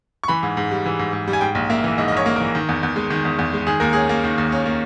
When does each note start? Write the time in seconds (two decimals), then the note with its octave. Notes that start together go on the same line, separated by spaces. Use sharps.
0.24 C#6
0.28 E3 B5
0.43 G#2
0.57 G#2
0.71 G3
0.86 E3
0.99 G#2
1.13 G#2
1.28 G3
1.33 G#5
1.41 G#2 G5
1.55 A#1
1.70 A#3 E5
1.84 E3
1.98 G#2 D#5
2.08 D#5
2.12 A#1 C#5
2.26 A#3
2.36 E3 A#4
2.55 D#3
2.69 E2
2.83 E2
2.96 G#3
3.10 D#3
3.25 E2
3.39 E2
3.53 G#3
3.67 D#3 G#4
3.80 D#2 A#4
3.93 C#4 G#4
4.09 A#3
4.24 D#3
4.38 D#2
4.52 C#4
4.66 A#3